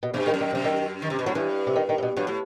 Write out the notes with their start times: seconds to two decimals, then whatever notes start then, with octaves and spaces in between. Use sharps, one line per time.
0.03 B2
0.13 G2 C3
0.27 D#3
0.34 F#2
0.41 D#3
0.53 F#2 C3
0.64 D#3
1.02 D#3
1.10 C3
1.19 B2
1.26 A2 F#3
1.35 G2 E3
1.67 C3
1.76 D#3
1.89 D#3
1.98 A2
2.03 B2
2.17 G2 F#3
2.27 A2